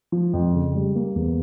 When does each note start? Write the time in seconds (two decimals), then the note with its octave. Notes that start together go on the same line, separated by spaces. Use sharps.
0.12 F3
0.33 F2
0.54 C#3
0.75 G3
0.95 A#3
1.16 E2